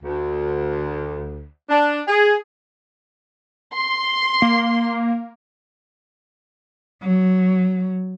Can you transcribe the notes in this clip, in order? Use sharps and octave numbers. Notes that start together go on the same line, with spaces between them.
D2
D4
G#4
C6
A#3
F#3